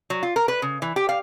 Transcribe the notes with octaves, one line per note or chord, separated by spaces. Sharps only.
F#3
F4
A#4
B4
C#3
E3
G4
F5